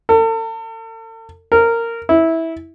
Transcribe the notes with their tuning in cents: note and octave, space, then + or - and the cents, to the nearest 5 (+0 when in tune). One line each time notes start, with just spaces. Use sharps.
A4 +40
A#4 -15
E4 -15